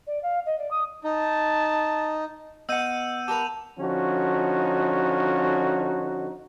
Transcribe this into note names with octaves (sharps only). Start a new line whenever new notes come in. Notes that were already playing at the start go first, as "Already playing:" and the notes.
D5
F5
D#5
D5
D#6
D#4 A5
B3 D#5 F#5 E6 G6 D#7
G4 A#4 B4 A5 D6 F7
D3 F3 C#4 D#4 F#4